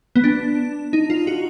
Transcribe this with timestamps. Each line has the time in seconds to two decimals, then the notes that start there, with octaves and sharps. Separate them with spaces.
0.16 B3
0.24 D4
0.93 D#4
1.10 F4
1.27 F#4